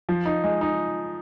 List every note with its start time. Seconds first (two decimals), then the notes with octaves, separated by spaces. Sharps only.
0.09 F3
0.25 D#4
0.44 G#3
0.61 D#4